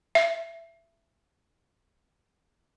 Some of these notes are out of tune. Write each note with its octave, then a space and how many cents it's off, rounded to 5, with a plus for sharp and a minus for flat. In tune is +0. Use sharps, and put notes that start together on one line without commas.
E5 +20